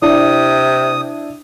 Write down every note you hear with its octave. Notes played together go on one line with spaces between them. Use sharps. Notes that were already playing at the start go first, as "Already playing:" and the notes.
C3 D4 E4 D5 D#6